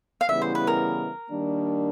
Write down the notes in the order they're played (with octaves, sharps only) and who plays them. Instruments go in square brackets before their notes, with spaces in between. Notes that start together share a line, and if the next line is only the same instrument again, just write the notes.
[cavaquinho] F5
[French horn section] C#3 E3 G3 B3 E4 [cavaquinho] E5
[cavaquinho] C5
B4
A#4
[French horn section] D#3 G3 A#3 D4